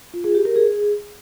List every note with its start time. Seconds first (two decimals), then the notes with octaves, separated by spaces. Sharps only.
0.14 F4
0.24 G#4
0.35 G4
0.45 A#4
0.56 G#4